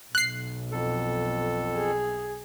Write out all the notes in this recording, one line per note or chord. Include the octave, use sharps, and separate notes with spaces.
B1 F#6 C7
F2 A4
G#4